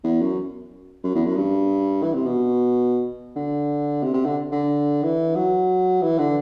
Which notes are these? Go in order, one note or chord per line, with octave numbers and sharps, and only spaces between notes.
E2
F#2
F#2
E2
F#2
G2
E3
C3
B2
D3
C3
C3
D3
D3
E3
F#3
E3
D3